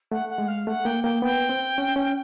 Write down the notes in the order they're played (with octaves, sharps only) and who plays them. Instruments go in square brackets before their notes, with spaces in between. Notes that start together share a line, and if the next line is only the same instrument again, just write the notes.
[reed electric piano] A3 [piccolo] F#5
[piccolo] F#5
[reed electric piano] G#3
[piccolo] F5
[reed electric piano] A3 [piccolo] F#5
[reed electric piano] A#3 [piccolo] G5
[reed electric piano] A#3 [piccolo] G5
[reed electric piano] B3 [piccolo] G5
[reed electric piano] C4
C#4
C#4